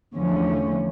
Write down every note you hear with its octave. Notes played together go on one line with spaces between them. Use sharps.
E2 D3 F3 A3 C#4